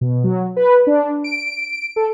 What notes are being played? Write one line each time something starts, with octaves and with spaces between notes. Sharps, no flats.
B2
F#3
B4
D4
D7
A4